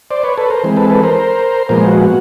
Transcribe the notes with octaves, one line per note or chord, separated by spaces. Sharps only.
C5 D5
B4 C#5
A4 B4
A#4 C5
E3 G#3 C4
A4 B4
A4 B4
A#4 C5
A#2 F3 G#3 B3 A#4 C5
F#4
F#4